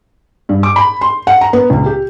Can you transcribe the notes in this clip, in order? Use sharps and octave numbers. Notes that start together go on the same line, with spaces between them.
G2
D6
B5
C6
F#5
A#5
B3
C#2
G4